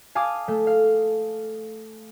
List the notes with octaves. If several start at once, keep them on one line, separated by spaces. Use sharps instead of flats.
F5 G#5 A5 D6 D#6
A3
F5